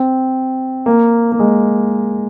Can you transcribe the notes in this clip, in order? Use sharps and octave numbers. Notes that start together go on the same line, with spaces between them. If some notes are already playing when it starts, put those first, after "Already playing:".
Already playing: C4
A#3
A#3
G#3